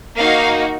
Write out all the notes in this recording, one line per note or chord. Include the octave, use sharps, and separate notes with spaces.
A#3 D#4 F#4 F5